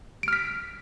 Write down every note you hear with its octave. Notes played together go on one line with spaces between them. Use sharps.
F6 B6 D7